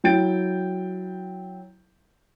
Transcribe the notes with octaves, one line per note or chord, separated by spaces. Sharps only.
F#3 E4 G5 G6 A6 D7